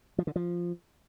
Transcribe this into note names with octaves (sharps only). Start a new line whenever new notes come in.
F3
D3
F3